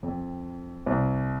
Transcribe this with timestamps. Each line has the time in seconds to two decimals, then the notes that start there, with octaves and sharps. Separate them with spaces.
0.03 F2
0.86 C2